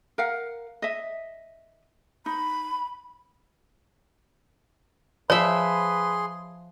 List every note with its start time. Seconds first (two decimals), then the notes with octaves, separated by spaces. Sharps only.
0.18 A#4 F5 F#5
0.82 D#5 E5
2.26 D#4 B5
5.30 F3 G#4 B4 C#5 E5 C6